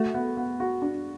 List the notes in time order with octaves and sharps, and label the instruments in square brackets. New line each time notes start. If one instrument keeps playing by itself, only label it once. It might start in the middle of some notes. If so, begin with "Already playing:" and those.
Already playing: [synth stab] A3 [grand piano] F#4
[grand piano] B3
B3
F#4
D4